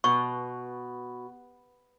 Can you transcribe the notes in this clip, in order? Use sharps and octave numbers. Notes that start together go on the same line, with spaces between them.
B2 C#6